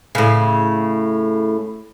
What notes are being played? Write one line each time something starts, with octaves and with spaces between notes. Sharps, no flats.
A2 C#3